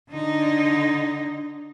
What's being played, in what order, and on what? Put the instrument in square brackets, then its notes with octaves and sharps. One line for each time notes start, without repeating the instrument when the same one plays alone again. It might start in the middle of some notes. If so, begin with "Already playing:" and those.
[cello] D3 D#4